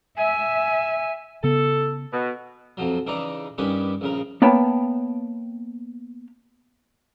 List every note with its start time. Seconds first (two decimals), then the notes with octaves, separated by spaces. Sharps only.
0.17 E5 G#5
1.44 C#3 B3 A4
2.13 B2
2.77 F2 F3 F#3
3.07 C#3 E3 D#4 D5 A#5
3.58 G2 D#3 C#4 G4 B4 D6
4.01 A#1 C#3 A#4
4.42 A#3 B3 C#5 G5 A5